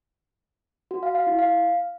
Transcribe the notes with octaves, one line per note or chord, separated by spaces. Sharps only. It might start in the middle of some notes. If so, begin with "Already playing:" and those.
F#4
F5
F5
E4
F5